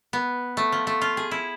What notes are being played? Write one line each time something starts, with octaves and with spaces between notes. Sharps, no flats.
B3
A3
F3
A3
F4
G#4
E4